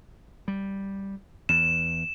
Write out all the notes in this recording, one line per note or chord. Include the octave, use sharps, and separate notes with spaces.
G3
E2 E7